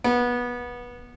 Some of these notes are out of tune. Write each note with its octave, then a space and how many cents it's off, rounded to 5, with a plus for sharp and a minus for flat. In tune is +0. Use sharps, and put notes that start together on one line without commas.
B3 -20